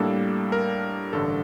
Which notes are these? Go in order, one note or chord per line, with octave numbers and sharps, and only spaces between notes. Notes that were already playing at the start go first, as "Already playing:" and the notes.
Already playing: A2 G3 A#3 D4 A4
A#4
A1 G2 D3 A4